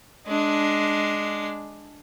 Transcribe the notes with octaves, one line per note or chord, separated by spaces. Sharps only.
G#3 D4